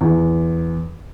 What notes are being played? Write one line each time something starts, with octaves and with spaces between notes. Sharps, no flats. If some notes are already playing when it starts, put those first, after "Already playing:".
E2